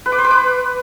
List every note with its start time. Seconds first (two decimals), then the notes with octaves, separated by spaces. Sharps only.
0.06 B4
0.12 D6
0.18 C5
0.24 B4
0.31 D6